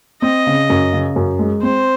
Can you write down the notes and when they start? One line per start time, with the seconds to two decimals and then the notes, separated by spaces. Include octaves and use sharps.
0.22 C4 D#5
0.47 C#3
0.70 F#2
0.93 C#3
1.16 F#2
1.39 G#3
1.62 C4 C5